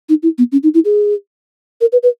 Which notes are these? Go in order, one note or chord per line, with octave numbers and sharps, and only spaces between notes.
D#4
E4
B3
C#4
D#4
E4
G#4
A#4
B4
B4